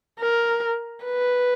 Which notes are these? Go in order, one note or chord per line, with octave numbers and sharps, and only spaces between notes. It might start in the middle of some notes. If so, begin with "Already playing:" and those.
A#4
B4